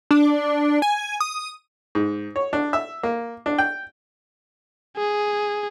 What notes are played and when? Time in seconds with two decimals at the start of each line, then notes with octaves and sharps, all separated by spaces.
0.11 D4
0.82 G#5
1.20 D#6
1.95 G#2
2.36 C#5
2.53 D4
2.73 E5
3.03 A#3
3.46 D4
3.58 G5
4.97 G#4